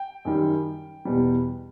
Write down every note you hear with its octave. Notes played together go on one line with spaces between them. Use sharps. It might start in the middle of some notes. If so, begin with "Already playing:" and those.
Already playing: G5
F#2 D#3 G3
E2 B2 G3